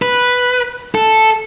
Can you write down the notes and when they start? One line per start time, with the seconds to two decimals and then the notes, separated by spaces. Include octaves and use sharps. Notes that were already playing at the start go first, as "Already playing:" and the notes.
0.02 B4
0.95 A4